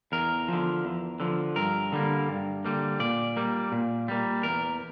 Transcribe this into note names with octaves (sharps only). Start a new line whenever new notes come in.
E2 A#4
D3 F3
E2
D3 F3
G2 A#4
D3 G3 A#3
G2
D3 G3 A#3
A#2 D5
G3 A#3
A#2
G3 A#3
E2 A#4